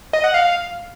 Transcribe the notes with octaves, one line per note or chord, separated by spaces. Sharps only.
D#5
F#5
F5